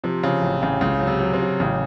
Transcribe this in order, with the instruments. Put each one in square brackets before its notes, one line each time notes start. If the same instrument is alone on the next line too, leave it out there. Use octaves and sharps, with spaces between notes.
[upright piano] C3 [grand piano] F3
[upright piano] C#3 [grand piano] F3
[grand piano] A1
[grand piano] A1 [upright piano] C#3
[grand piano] C#2 [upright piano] C#3
[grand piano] F#3
[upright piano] C3
[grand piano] F#3
[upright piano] C3
[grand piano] F#3
[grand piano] A1 [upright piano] C#3